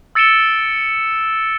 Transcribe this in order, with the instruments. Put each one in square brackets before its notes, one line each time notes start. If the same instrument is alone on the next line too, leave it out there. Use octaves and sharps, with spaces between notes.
[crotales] E6 A6 C#7 D7 E7 G7